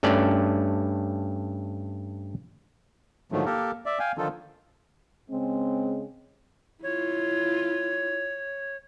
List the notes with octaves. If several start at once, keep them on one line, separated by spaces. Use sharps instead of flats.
G2 A3 C#4 D5
G#2 D3 D#3 F3 F#3 A3
A#3 G4 A4 A#4
D5 E5
F5 G5 G#5
D3 D#3 F3 D#4 F4 A4
C#3 G#3 C4
E4 F4 C#5